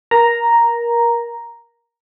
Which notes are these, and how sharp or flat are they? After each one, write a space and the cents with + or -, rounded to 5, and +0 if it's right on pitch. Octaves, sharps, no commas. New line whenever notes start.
A#4 +20 A#5 +0